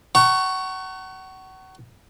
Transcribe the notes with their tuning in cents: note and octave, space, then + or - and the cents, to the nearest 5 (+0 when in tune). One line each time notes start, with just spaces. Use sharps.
F#5 +35 A#5 -35 C#6 +0